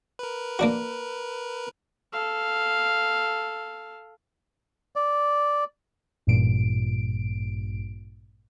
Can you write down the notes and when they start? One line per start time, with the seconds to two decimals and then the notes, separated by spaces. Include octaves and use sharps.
0.19 A#4 B4
0.59 A#3 D4 F#4
2.13 A4 F5
4.96 D5
6.27 A1 G2 A#2 D7